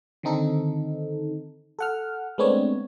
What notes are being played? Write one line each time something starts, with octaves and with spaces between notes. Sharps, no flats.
D3 D#3 C4 D#4 A4
A4 F#5 F6
G#3 A3 B3 C4 D4 C#5